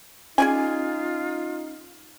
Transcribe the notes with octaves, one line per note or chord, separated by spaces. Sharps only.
C#4 D#4 F4 G#4 D5 G#5